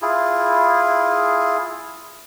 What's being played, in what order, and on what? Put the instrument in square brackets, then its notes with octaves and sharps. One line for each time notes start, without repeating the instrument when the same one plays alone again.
[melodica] E4 F4 G#4